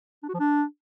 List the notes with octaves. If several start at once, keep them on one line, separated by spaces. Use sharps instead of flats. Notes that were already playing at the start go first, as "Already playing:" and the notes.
D4
F#4
F3
D4